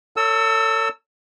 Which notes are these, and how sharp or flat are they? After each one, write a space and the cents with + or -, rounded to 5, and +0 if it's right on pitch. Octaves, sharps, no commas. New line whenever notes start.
A4 +35 C#5 +20 E6 -10